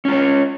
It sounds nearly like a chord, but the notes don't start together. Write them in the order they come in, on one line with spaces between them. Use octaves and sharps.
C#4 F4 C#5